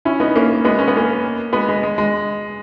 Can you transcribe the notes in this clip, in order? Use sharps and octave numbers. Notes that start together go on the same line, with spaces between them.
C#4 E4
B3 D#4
A#3 C#4
G#3 B3
C#4
B3
A#3 C#4
G#3 B3
G#3
G#3
G#3